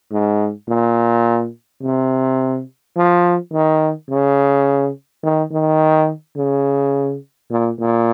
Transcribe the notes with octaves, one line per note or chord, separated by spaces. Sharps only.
G#2
A#2
C3
F3
D#3
C#3
D#3
D#3
C#3
A#2
A#2